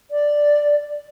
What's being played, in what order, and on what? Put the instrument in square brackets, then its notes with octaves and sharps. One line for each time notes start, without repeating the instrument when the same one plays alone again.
[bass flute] D5